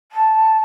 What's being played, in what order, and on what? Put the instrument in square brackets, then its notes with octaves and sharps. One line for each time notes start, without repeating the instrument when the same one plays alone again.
[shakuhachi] A5